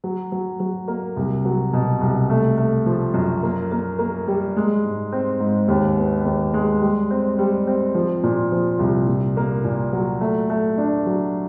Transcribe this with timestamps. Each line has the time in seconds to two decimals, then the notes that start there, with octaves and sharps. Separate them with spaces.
0.04 F#3
0.32 F#3
0.60 F#3
0.88 A#3
1.16 C2
1.45 F#3
1.73 B2
2.01 C2
2.30 A3
2.58 A3
2.86 F3
3.14 F#2
3.43 A#3
3.71 A#3
3.99 A#3
4.27 G3
4.56 G#3
4.84 G#2
5.12 C4
5.40 G#2
5.68 D#2
5.98 B3
6.25 D#2
6.54 G#3
6.81 G3
7.10 C4
7.38 G3
7.67 C4
7.95 F3
8.23 A#2
8.52 F3
8.79 C2
9.07 A#2
9.37 A#3
9.64 A#2
9.93 F#3
10.21 A3
10.50 A3
10.78 D4
11.06 F#3